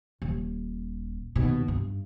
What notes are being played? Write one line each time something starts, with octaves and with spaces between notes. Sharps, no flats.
D#1
D#2 B2
G2